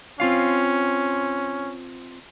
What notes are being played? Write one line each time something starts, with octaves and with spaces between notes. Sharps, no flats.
C4 C#4 F4 F5